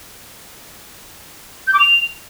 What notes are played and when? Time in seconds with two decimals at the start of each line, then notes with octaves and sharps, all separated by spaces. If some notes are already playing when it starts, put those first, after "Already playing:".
1.67 G6
1.74 D6
1.80 F7